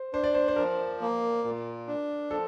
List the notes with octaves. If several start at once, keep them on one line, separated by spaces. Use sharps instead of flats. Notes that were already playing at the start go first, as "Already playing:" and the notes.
Already playing: C5
D4 C5
D5
C5
C5
F3 A#4
A#3
A#2
D4
F3 A4